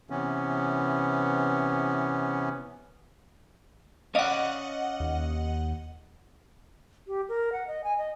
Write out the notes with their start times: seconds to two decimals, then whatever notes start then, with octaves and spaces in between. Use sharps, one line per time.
0.10 C3 E3 B3 C#4
4.15 C#4 D5 D#5 F5 F#5
5.00 D#2
7.07 G4
7.29 A#4
7.52 F#5
7.67 D#5
7.84 G#5
7.98 D#5